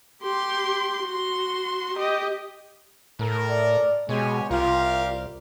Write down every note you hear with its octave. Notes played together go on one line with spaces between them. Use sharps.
G4 C6
F#4 C6
G4 D#5
A2 A4 A#4
D5
B2 G#3 G4 C#5 G#5
C2 F4 G4 A#4 F5